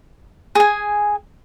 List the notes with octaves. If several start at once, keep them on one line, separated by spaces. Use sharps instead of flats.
G#4 G#5